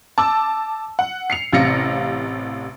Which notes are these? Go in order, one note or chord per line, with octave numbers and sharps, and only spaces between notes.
A5 D6 E6
F#5
C7 C#7 F7
A1 C3 F5 A#6 C#7